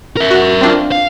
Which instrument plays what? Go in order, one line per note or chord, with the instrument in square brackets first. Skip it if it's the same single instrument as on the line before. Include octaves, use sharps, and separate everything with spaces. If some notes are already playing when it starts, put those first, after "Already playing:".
[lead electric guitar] A#4 E5
[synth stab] F#4
C4 D4 F4
[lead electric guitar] F5